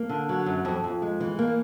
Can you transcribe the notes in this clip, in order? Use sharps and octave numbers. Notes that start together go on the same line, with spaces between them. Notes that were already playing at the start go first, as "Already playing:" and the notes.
Already playing: A#3
D3
F#3
F#2
F2
F2
G#3
E3
A#3